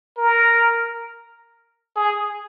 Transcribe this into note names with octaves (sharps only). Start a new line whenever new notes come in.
A#4
G#4